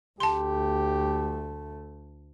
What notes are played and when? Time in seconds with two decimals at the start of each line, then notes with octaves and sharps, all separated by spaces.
0.20 D2 A3 G4 A5 C6